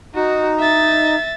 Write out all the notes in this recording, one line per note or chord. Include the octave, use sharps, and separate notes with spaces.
D#4 F#4
E5 A6